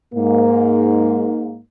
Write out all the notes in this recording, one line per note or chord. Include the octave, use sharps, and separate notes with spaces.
G#2 A#3